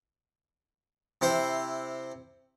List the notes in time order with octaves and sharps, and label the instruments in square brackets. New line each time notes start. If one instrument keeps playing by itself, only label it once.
[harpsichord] C3 E4 C5 C6